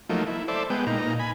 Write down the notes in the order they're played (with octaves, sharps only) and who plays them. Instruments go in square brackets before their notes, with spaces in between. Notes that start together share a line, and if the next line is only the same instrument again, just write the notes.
[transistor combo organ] F3 F#3 A3 A#3 D#4
E4
A4 C5 D5 E5
G#3 B3 G5
A#2 D#4 A#5
G#5 B5